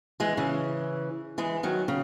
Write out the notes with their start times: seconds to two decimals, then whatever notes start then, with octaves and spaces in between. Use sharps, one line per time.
0.20 E3 G#3
0.37 C#3 E3
1.38 E3 G#3
1.63 D#3 F#3
1.88 C#3